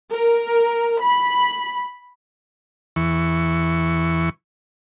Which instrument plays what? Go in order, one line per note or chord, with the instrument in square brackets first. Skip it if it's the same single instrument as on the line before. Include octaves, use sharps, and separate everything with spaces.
[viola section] A#4
B5
[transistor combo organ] E2 E3 C#6